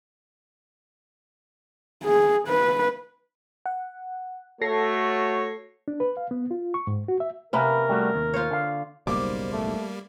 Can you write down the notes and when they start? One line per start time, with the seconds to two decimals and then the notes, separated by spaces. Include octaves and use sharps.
2.04 G#4
2.48 B4
3.66 F#5
4.61 A3 F#4 A4 C#5 A#6 C7
5.88 D4
6.00 B4
6.17 F5
6.31 B3
6.51 F4
6.74 C#6
6.87 G#2
7.08 F#4
7.20 E5
7.53 C3 A#3 C#4 A#4 B4
7.89 G3 A3 F#4
8.14 D#2
8.34 F4 C5 C#5
8.51 D3 F5
9.07 F#1 B1 G#2 G3 A#3 C5 D6
9.53 A3